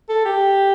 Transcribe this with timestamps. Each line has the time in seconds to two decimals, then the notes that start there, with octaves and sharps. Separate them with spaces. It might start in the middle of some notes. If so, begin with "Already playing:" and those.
0.09 A4
0.25 G4